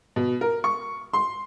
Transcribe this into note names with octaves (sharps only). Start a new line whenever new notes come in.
B2
A#4
C#6
C6